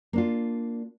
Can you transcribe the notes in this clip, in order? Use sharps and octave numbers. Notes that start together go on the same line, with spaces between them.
A#3 D4 F4